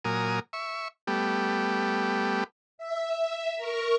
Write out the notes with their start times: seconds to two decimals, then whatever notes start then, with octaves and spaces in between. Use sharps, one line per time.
0.05 A#2 F#3 A#4 G#5 D#6
0.53 E5 C#6
1.07 G3 A3 B3 G4
2.78 E5
3.56 A#4 C#6